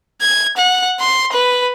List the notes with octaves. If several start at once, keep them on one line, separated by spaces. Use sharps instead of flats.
G#6
F#5
C6
B4